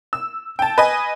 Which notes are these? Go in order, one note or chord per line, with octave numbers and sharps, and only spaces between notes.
E6
G5 A5
B4 D#5 G#5